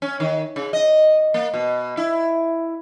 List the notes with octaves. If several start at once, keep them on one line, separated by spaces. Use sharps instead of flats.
C#4
D#3
C#3
D#5
A#3
B2
E4